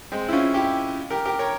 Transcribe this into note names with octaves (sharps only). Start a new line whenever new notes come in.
G#3 C4
E4
C#4 F4
E4 G4
G4 A#4
G4 A#4
A#4 C#5